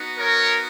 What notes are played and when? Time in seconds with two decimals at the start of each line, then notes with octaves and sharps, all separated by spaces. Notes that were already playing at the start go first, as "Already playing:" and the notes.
Already playing: B3 D#4 F#4
0.19 A#4 C#5